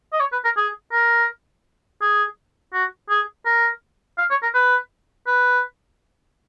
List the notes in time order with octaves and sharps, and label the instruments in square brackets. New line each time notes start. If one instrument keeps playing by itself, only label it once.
[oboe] D#5
C#5
B4
A#4
G#4
A#4
G#4
F#4
G#4
A#4
F5
C#5
A#4
B4
B4